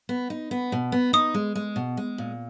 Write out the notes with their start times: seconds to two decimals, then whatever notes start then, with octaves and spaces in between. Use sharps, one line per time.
0.09 B3
0.30 D#4
0.51 B3
0.72 B2
0.92 B3
1.13 D#4 D#6
1.34 G#3
1.55 G#3
1.76 B2
1.97 G#3
2.18 A#2